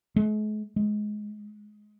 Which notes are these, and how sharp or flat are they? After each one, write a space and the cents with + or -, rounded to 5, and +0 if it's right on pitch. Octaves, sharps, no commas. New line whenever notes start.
G#3 +45
G#3 +15